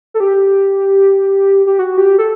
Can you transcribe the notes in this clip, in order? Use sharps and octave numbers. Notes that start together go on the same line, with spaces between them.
A4
G4
G4
F#4
G4
A4